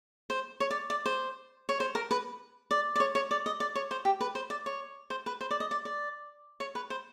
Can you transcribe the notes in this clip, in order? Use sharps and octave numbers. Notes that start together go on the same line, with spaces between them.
C5
C#5
D5
D5
C5
C#5
C5
A#4
B4
D5
D5
C#5
C#5
D5
D#5
D5
C#5
C5
G4
B4
C5
D5
C#5
C5
B4
C5
D5
D#5
D5
D5
C#5
B4
C5